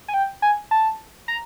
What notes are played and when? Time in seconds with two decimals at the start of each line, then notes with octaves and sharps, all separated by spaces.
0.08 G#5
0.14 G5
0.42 G#5
0.71 A5
1.28 A#5